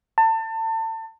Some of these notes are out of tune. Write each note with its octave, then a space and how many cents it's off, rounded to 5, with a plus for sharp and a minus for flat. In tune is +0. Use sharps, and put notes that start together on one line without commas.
A5 +30